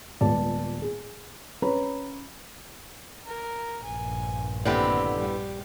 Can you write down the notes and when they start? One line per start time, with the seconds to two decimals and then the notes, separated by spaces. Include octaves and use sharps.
0.21 D#1 G#3 B3 F4 D5 A5
0.82 G#4
1.62 C#4 B4 C#5 A#5 B5
3.27 A#4
3.84 A#1 G2 G#5
4.65 D#2 A2 D3 B3 C4 G4 D5
5.17 G3